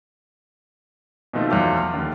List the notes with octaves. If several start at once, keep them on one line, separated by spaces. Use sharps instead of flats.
B2 D#3 F3 A3 C4 A4
E2 F3 F#3 A3 F5 D6
F6
D#2 D3